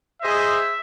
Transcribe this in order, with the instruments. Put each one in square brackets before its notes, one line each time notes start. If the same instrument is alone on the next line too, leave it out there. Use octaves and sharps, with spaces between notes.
[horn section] G#4 C5 D#5 [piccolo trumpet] E5